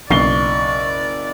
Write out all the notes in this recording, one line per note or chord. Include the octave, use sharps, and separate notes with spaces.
F#1 B1 D5 C#6 C7 G7